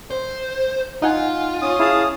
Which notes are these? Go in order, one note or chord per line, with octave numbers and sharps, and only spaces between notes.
C5
D#4 F4 F#5 G#5
C#4 D#6
E4 G#4 F5 A5